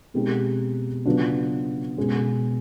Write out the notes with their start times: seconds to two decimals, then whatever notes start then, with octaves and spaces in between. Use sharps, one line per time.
0.14 B2 G#3 C4 D#4 G4
1.06 C#3 F#3 B3 D4 F4
1.98 B2 G#3 C#4